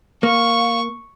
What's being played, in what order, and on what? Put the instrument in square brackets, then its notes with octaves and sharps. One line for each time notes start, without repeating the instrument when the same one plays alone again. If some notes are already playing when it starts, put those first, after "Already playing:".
[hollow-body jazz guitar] A#3 [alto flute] F5 [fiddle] C#6